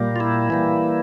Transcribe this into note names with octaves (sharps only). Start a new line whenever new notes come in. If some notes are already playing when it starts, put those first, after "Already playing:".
Already playing: A#2 G3 A#3
F4
E4
E3 G3 A#3